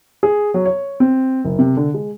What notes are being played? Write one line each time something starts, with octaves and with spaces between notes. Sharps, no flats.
G#4
F#3
C#5
C4
F#1
C3
D3
G#3